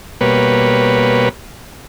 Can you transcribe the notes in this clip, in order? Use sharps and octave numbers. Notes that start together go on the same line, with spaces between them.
B2 G3 A#3 B4 C#5